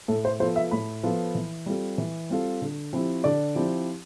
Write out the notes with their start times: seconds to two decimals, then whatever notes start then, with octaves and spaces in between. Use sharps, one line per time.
0.08 A2 A4
0.25 C5
0.40 F3 B3 F4 A4 C5
0.56 E5
0.71 A2 B5
1.03 F3 B3 F4 A4
1.35 E3
1.66 G3 C4 F4 A4
1.98 E3
2.30 G3 C4 F4 A4
2.62 D3
2.93 F3 C4 E4 G4
3.24 D3 D5
3.56 F3 C4 E4 G4